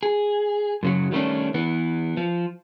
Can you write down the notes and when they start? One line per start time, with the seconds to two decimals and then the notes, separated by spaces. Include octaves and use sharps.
0.03 G#4
0.83 F#2 C#3 F#3
1.12 D#3 G3 A3 A#3 C#4 D4
1.54 E3 B3
2.17 F3